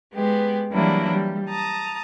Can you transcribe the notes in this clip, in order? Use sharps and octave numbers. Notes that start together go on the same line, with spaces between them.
G#3 B3 G4
E3 F#3 G3 A#3 D4 E4
G3
A5 A#5 D#6